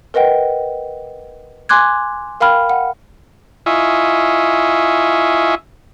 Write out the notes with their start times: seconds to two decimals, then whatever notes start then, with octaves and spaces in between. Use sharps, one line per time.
0.14 A#4 B4 D#5 F#5 G5
1.69 G#5 C6 D6 F#6 G#6
2.40 A#4 F5 G5 B5 F6
2.70 F#5
3.66 E4 F4 D#5 E5 G#5 C#6